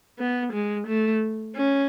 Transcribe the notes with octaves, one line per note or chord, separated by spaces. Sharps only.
B3
G#3
A3
C#4